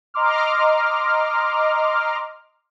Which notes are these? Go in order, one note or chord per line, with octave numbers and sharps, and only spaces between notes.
D#5 A#5 C6 D6 F6